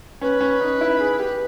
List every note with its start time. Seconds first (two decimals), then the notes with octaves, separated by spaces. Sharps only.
0.21 C#4 B4
0.41 C#4
0.61 D#4
0.81 E4
0.99 G#4
1.19 G4